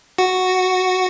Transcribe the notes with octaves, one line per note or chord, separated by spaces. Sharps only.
F#4